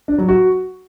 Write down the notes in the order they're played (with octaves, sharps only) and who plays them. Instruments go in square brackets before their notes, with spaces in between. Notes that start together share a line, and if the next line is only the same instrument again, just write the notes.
[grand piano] D4
F#3
F#4